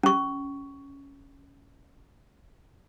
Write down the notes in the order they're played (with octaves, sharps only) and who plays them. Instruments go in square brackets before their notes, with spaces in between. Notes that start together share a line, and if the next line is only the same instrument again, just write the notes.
[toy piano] C#4 C#6